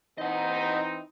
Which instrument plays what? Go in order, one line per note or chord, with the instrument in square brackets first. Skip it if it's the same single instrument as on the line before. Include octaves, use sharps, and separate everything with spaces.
[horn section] E3 C4 D#4 [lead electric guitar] D#5 F#5